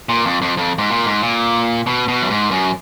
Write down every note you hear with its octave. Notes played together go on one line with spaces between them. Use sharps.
A#2
F2
F2
F2
G#2
A#2
G#2
A#2
B2
B2
F#2
G#2
F#2